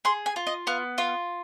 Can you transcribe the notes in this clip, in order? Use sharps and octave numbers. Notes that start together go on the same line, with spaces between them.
G#4 C6
G#5
F4
D#5
B3 F5
F4 F5